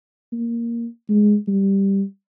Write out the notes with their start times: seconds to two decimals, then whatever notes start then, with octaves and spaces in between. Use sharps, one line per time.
0.32 A#3
1.09 G#3
1.48 G3